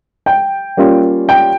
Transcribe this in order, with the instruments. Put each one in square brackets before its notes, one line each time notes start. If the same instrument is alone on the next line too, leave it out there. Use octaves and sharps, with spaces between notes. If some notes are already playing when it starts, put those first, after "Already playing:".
[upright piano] G5
G3 A#3 C#4 F4
G5